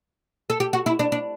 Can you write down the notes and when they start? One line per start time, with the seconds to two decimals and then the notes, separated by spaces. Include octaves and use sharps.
0.50 A4
0.60 G4
0.73 F#4
0.86 E4
0.99 D4
1.12 D4